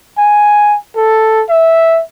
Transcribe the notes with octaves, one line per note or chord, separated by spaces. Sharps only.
G#5
A4
E5